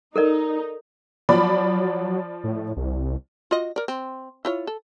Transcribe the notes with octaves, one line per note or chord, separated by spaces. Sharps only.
D#4 A4 A#4 D5
F3 F#3 D5 B5
A2
C2
F4 F#4 D#5
A#4 D5
C4
E4 F4 C#5
A4